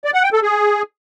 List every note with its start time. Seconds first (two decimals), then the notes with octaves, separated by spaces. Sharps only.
0.05 D5
0.14 F#5
0.23 G5
0.33 A4
0.42 G#4